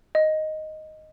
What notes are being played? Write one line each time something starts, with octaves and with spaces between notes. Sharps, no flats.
D#5